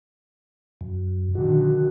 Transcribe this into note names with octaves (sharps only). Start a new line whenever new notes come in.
F#2
A#1 D3 D#3 F#4